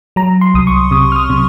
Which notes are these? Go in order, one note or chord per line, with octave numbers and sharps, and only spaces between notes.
F#3 A#5
C6
C2 D#6
C#6
C3 D#6
F6
D#6
C3